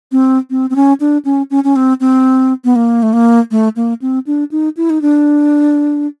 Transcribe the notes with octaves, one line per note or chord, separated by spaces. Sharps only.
C4
C4
C4
C#4
D4
C#4
C#4
C#4
C4
C4
B3
A#3
A3
A#3
A3
A#3
C4
D4
D#4
E4
D#4
D4